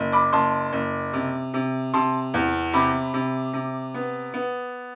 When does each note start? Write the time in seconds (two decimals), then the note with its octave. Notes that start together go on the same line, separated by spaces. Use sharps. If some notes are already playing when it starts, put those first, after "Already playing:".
Already playing: F#1
0.12 B5 D6
0.33 F#1 A5 C6
0.73 F#1
1.13 C3
1.54 C3
1.94 C3 A5 C6
2.34 E2
2.73 C3 B5 D6
3.14 C3
3.53 C3
3.94 B3
4.34 B3